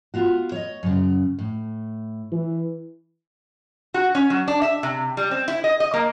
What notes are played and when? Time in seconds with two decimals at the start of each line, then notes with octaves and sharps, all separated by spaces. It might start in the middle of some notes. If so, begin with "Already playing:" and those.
0.14 B3 F4 F#4
0.52 C#5 D#5
0.83 F#2 C#3
1.39 A2
2.32 E3
3.94 F#4
4.15 C#4
4.30 F#3
4.48 D4
4.62 E5
4.83 C3
5.17 G3
5.31 C4
5.48 E4
5.64 D#5
5.80 D#5
5.94 A#3